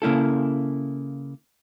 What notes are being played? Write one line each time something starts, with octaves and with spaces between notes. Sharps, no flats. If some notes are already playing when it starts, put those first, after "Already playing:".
C#3 A#3 E4 A4